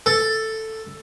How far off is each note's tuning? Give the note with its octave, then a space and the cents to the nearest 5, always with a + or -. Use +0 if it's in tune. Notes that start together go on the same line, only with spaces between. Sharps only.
A4 +5